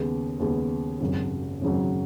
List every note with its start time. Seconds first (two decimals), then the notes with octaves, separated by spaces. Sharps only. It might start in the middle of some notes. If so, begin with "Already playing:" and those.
Already playing: D#2 C#3 G#3 B3
0.40 D#2 C#3 G#3 B3
1.01 G#1 F#2 C#3 F#3
1.61 G#1 F#2 C#3 F#3